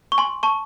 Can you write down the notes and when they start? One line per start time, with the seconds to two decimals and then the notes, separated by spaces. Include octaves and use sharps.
0.12 C#6
0.18 G#5 C6
0.43 A5 C#6